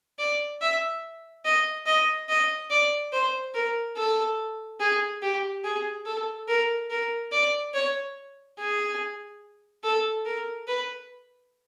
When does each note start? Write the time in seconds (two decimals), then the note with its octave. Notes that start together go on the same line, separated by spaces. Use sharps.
0.19 D5
0.61 E5
1.44 D#5
1.86 D#5
2.29 D#5
2.70 D5
3.12 C5
3.54 A#4
3.96 A4
4.80 G#4
5.22 G4
5.64 G#4
6.06 A4
6.48 A#4
6.90 A#4
7.32 D5
7.74 C#5
8.58 G#4
9.84 A4
10.25 A#4
10.67 B4